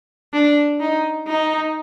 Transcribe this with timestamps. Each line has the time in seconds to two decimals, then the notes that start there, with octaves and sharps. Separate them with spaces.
0.34 D4
0.80 D#4
1.28 D#4